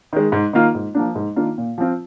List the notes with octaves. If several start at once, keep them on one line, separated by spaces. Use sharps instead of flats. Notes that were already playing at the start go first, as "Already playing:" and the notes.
D#3 G#3
G#2
D#3 A#3 F4
G#2
F3 A#3 D4
G#2
D#3 A#3 D4 F4
A#2
F3 C4 F4